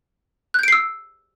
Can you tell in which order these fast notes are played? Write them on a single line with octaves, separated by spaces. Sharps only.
F#6 G6 D7 C7 E6